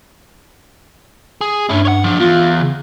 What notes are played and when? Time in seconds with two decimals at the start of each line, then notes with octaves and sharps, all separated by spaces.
1.41 G#4
1.69 G2 C#4 E4
1.85 C#5 F#5
2.04 F3 D4
2.20 E2 F4
2.61 C#3